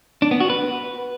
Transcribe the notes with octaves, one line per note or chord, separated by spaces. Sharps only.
D4
B3
F#4
B4